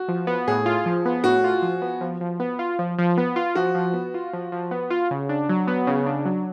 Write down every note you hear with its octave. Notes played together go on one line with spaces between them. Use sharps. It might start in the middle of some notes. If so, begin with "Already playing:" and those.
Already playing: F#4
F3
B3
A2 G#4
F4
F3
B3
A2 F#4
F4
F3
B3
F3
F3
B3
F4
F3
F3
B3
F4
F3 F#4
F3
B3
F4
F3
F3
B3
F4
C#3
D4
F#3
B3
C#3
D4
F#3